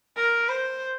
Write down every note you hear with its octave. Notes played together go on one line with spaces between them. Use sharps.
A#4
C5